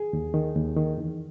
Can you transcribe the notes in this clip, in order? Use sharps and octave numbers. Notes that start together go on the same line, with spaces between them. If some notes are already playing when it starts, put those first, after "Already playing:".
Already playing: G#4
D#2
D#3
D#2
D#3
E2